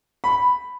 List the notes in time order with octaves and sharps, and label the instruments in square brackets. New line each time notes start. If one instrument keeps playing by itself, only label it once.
[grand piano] B5